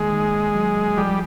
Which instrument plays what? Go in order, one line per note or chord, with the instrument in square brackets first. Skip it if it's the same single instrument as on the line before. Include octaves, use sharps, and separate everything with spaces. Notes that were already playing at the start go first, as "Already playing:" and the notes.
Already playing: [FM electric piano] D#3 A#3 [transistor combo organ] G#3
[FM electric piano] D#3
F#3
[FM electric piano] F3 [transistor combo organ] G3